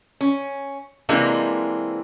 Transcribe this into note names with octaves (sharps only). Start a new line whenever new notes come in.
C#4
C3 E3 G#3 A#3 C4 D4